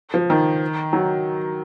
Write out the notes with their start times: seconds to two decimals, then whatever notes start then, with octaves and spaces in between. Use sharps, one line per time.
0.14 F3
0.30 D#3
0.93 F#3